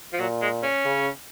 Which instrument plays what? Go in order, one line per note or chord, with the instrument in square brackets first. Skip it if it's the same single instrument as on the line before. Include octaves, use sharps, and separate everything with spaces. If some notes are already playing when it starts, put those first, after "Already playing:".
[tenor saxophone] F3
[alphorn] A#2 [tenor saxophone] F#3
[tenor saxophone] G#3
C#4
[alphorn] C#3